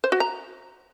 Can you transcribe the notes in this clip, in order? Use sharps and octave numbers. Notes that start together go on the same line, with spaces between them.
C5
F#4
A#5